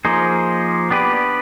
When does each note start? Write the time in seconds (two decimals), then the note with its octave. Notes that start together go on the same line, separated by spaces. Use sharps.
0.05 F3 A#3 D#4 G#4 C5
0.91 B3 D4 G4 B4 D5